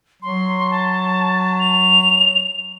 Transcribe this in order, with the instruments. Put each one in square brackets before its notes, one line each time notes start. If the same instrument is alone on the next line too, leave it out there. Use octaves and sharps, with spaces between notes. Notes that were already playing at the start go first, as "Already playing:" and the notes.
[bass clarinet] F#3 [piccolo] C6
[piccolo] A5
F7